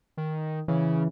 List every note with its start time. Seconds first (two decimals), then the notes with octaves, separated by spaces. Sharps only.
0.17 D#3
0.68 C#3 E3